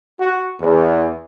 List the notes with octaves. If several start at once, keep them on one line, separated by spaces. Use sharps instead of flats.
F#4
E2